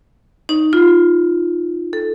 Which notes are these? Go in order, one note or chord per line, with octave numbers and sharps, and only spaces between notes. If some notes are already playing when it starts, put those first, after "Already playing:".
D#4
F4
A4